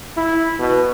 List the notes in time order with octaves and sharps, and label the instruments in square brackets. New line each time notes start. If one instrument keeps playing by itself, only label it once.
[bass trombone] E4
B2